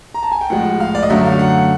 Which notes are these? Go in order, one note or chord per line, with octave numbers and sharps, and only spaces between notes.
A#5
A5
G#5
G5
A2 F3 G#3 F#5
F5
D5
D#5
F#2 D3 F#3 A3 E5
F5
F#5